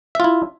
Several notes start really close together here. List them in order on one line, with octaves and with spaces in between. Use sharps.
E5 F4 E4